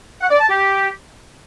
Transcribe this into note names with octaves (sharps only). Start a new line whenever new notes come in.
F#5
D5
A5
G4